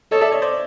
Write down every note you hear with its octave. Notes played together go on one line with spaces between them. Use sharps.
A4 C#5 D#5
D5 E5
C#5 D#5
C5 D5